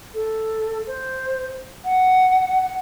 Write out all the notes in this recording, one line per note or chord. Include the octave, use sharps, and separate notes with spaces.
A4
C5
F#5